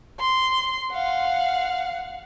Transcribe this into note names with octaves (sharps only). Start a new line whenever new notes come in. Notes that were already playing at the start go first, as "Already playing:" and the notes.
C6
F5 F#5